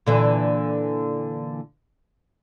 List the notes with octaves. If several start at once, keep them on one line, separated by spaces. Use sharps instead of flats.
A#2 D3 E3